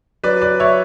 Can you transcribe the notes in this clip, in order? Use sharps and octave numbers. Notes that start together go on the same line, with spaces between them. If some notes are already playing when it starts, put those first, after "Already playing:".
F#3 B4 D5
B4 D5
C#5 E5